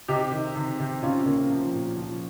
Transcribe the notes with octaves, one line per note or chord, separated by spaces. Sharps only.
C3 D#4 G4
D#3
C3
C3
C3 C#4 F4
C3 A#3 C#4
F3
A#2
F3